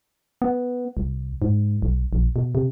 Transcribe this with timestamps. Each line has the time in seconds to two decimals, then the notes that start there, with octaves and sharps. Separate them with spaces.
0.42 B3
0.97 C2
1.42 G#2
1.82 B1
2.13 A#1
2.36 B2
2.55 C3